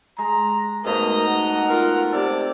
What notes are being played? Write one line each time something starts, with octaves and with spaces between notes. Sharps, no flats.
G#3 A#5
G#2 B2 A3 A#4 D#5 A#5
F#5
F4 A#4
C3 A4 D5